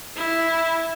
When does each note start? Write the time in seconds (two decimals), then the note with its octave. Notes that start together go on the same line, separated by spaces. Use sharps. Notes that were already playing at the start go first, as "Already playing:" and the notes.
0.16 E4